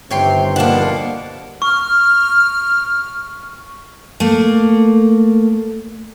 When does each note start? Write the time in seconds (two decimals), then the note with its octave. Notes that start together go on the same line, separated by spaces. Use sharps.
0.11 G1 G2 C3 D#3 C#5 G5 C6
0.56 B2 F3 A#3 D4 F#5 A5
1.62 C#6 F6
4.20 A3 A#3